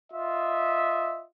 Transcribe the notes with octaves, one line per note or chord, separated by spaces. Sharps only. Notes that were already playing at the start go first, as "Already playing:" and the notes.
F4 D#5 E5